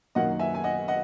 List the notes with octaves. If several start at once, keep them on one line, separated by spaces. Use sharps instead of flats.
F#2 D#3 F#3 A#3 D#5 F#5
E5 G#5
G#5
D#5 F#5
D#5 F#5